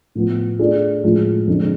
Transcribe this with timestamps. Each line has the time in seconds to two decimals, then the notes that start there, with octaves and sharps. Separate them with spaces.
0.15 A2 F3 B3
0.59 A3 D4 F4 G#4
1.04 A2 F3 G#3
1.47 F2 D3 G#3